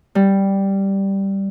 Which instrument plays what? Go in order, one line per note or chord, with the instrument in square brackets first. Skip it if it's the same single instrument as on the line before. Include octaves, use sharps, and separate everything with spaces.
[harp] G3